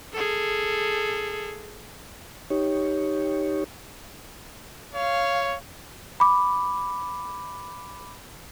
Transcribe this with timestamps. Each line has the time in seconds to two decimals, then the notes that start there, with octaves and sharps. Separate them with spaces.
0.12 G#4 A4
2.50 D#4 G4 C#5
4.95 C#5 F5
6.20 B5 D6